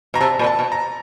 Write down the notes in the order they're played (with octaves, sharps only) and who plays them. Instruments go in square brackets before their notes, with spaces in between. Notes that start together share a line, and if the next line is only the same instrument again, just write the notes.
[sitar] B2 [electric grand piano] A#5
[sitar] C3 [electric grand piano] A5
[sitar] A#2
[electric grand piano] A5
[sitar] B2
[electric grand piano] A#5